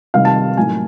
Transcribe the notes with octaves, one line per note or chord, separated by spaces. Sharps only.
C3 D#3 G3 F5
A5
A2 F#3 A#3 D#4 G#5